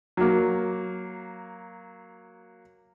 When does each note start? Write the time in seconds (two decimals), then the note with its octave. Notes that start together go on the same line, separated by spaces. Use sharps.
0.17 F#3 A#3